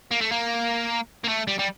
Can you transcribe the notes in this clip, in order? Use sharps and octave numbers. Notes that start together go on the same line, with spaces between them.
A#3
A3
A#3
A#3
A3
G3
G3